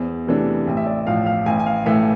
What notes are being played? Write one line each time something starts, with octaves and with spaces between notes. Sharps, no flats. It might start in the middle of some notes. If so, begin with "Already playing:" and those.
Already playing: E2 C5
C3 E3 A3 D4
A1
E5
D5
A2 F3 F5
F5
A1 G#5
G#5
F5
A2 E3 A3 E5